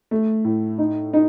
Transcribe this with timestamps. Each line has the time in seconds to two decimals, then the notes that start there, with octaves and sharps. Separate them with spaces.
0.11 A3
0.45 A2
0.78 D#4
1.13 D#4